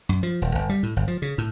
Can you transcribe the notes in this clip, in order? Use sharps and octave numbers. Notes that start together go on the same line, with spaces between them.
F#2
F3
D#1
G1
G3
A2
G1
F3
C#3
A2